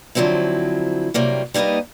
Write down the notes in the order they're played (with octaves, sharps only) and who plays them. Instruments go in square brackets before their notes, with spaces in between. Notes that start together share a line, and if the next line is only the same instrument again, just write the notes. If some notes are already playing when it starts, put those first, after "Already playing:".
[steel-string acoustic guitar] D3 F3 F#3 C4 E4
C3 F#3 G3 A#3
G3 A#3 D#4 B4 D#5